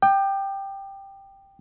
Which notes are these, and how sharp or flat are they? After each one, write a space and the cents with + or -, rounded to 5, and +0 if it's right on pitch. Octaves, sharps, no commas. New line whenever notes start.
G5 +0 D6 +40